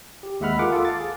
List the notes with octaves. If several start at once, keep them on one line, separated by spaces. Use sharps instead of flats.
G4
D#2 G#3 E5 F#5 B5 F6
F4 G#4 A#4 F#5 D6
F4 A4 D6
F5 A6
G#4